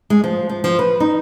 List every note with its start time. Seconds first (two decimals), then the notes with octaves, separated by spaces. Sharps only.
0.10 G#3
0.24 F3
0.49 F3
0.64 F3
0.79 B4
1.00 D#4